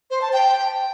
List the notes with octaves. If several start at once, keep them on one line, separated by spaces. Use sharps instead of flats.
C5
A5
G5